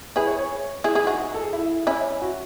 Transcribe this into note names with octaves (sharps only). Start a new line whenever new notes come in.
E4 G#4 B4
C#5
C#5
E4 G#4
E4 G#4
D#4 F#4
A4
G#4
E4
C#4 E4
F#4